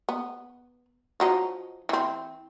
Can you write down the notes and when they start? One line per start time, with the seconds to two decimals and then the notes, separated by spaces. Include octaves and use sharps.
0.09 B3
1.20 F3 F#3 D#4
1.89 E3 C4